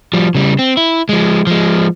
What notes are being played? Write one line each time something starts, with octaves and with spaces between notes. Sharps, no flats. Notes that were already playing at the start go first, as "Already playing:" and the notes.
F3 G3
C#3 G3
C4
E4
F3 G#3
F3 G#3